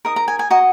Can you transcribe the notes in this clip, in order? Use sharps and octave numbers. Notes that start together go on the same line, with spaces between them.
D#4 A#4 D#6
A#5
G#5
G#5
F#4 D#5 A#5